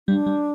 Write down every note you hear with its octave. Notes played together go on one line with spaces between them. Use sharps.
G3 D4
G3